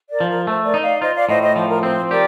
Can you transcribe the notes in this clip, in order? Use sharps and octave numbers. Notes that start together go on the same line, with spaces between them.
A#4 D5
F3
A#4
A3 C5
A#4 D5
D#4
D5 F5
F4 C5 D#5
D5 F5
A2 C5 D#5
C5 D#5
F3 C5
A#4
C4 C5
G4 A#4 D5